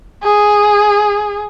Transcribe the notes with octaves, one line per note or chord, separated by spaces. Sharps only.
G#4